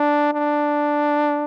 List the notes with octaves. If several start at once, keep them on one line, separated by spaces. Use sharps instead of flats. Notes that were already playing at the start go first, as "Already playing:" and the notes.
Already playing: D4
D4